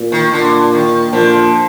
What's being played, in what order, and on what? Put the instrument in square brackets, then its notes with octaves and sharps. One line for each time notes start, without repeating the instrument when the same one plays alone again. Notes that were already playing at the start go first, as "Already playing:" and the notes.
Already playing: [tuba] A#2
[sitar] D#3
[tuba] A#2 [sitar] D3
[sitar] D#3
[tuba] A#2 [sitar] D3 F3